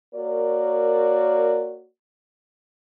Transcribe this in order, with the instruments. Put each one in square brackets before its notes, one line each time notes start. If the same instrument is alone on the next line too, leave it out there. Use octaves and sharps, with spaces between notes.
[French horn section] A#3 F#4 A#4 C#5 D5